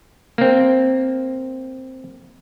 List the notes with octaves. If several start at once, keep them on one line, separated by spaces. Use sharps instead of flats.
A#3 C4